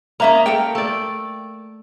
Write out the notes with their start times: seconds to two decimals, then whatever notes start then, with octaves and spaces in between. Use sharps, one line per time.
0.20 A#3 C#4 D#5 E5 A#5
0.46 A4 A#4 G5
0.75 A3 D5